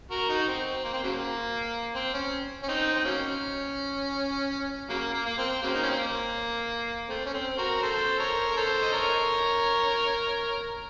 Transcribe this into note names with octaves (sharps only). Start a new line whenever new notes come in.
F#4 A#4
D#4 F#4
C4
A#3
C4
C#3 F#3 A#3
C4
C#4
C#4
C4 D#4
C4
F#3 A#3 C#4
C#3 F#3 A#3
A#3
A#3
C4
C#3 F#3 A#3
D#4
C#4
C4
A#3
A3 C4
C#4
C4
F#4 A#4
A4 C5
A#4 C#5
A#4
A4 C5
D#5
A#4 C#5